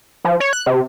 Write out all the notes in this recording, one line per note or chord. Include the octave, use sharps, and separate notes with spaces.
F3
C#5
F#6
C3